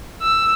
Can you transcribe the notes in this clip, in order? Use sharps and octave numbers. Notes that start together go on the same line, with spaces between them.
E6